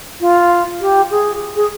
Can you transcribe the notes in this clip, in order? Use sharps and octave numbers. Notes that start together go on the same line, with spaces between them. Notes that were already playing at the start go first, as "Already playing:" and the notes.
F4
G4
G#4
G#4